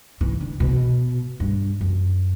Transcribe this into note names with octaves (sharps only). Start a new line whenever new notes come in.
E3
D3
B2
G2
F#2